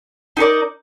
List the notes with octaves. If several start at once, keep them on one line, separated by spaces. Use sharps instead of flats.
D#4 G4 A#4 D5